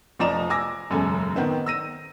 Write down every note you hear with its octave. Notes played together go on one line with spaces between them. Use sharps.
F1 F3 D5 D#5 A#5 E7
G#5 D6 E6 A#6
E1 F#2 C#3 A4 G#5
D#3 B3 C4 D#4
E6 A#6 D#7